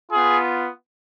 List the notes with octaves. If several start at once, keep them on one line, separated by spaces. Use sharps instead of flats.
B3 F4 G#4